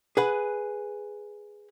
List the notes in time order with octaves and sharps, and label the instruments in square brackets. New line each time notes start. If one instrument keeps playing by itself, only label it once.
[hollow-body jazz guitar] G#4 B4 F#5